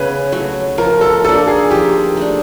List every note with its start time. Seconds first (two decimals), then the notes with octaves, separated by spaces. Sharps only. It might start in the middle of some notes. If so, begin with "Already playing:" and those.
Already playing: C#3 B3 B4
0.32 F#3 A3
0.78 F3 A#4
1.01 A4
1.24 A#3 D4 A4
1.47 G#4
1.71 F3 G4
2.17 A3 D4